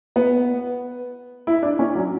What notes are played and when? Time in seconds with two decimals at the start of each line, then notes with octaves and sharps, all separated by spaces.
0.16 B3
1.47 E4
1.63 D4
1.79 C#4
1.95 F#3